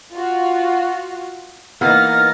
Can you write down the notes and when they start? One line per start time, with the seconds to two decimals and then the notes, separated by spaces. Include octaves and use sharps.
0.13 F4 F#4 F5
1.81 E3 A#3 B3 D#4 F6 A6 A#6